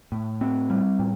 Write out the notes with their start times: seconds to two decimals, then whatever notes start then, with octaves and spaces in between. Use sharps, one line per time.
0.12 A2
0.41 C4
0.70 G3
0.99 A2